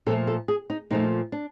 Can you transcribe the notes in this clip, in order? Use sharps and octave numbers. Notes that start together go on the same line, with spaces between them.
A#2 F3 A3 A4
A4
G#4
D#4
A#2 F3 A3 D#4
D4